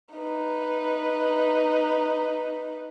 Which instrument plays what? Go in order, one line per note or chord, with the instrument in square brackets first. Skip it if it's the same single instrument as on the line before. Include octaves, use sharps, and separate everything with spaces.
[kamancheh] D#4 B4